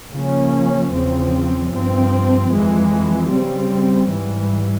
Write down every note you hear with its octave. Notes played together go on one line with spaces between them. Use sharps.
C#3 F3 A#3 C#4
E2 C#3 F3 C4
G2 F3 C4
F2 E3 G#3
C#3 G3 C4
G#2 E3 G3